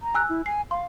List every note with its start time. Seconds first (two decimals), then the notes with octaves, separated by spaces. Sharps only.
0.01 A#5
0.15 G#5 E6 F#6
0.29 E4
0.46 G#5 C7
0.71 F5 C6